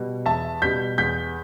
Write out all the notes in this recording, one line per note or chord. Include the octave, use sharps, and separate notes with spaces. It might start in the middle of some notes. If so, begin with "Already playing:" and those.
Already playing: B2 G3
E2 E5 A5
B2 G3 G6 B6
E2 G6 B6